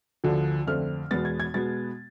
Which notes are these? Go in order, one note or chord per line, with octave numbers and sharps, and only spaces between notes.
D2 D3 F3
F2 D3 A3 C4 F6
E2 B2 G#3 B3 A6
G#6
G#6
B2 G#3 B3 A6